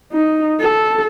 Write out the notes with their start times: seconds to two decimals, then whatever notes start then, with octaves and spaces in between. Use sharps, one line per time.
0.12 D#4
0.60 A4